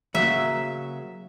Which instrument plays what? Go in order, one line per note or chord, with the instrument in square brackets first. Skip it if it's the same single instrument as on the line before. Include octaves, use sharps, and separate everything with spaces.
[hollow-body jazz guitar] C#3 F#3 A#3 [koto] E5